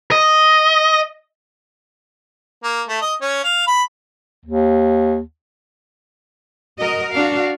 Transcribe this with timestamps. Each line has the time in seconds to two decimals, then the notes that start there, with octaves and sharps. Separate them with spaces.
0.12 D#5
2.63 A#3
2.88 A3
3.02 D#5
3.21 C#4
3.43 F5
3.67 B5
4.46 D#2
6.79 F#4 A#4 D#5
7.14 D4 F#4 F5